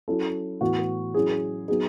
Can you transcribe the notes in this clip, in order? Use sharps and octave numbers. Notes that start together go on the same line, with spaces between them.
F#3 C#4 E4 A4
A2 E3 B3 E4 F#4
F#3 C#4 E4 G#4
F#3 B3 D#4 G#4